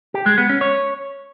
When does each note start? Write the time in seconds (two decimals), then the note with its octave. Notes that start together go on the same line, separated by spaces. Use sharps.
0.14 G4
0.26 G#3
0.38 B3
0.49 C#4
0.61 C#5